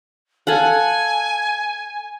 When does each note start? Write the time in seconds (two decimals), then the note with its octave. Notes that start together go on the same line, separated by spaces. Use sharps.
0.47 A4 F5 F#5 G#5